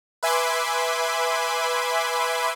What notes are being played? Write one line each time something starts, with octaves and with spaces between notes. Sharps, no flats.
B4 E5 G#5 B5 C6 D6